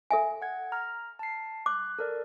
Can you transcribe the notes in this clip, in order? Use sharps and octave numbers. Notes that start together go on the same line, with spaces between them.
A4 E5 G#5
F#5 G#6
A#5 F6
A5 C7
D6 F#6
A4 A#4 D5